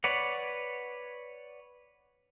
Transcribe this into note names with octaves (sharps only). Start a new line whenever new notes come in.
B4 C#5 D5 F#5